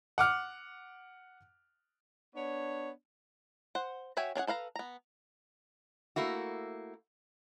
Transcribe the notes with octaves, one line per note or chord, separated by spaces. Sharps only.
F#5 D6 F6
B3 D4 C#5
C5 F#5
F#4 C#5 E5 G5 G#5
C#4 D4 G#4 F#5
A4 B4 F5 A#5
B3 A#5
A3 A#3 E4 F#4